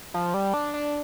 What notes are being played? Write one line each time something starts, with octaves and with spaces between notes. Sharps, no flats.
F3
G3
D4
D4